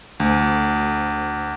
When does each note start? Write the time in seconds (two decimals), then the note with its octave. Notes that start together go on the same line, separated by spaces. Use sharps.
0.20 D2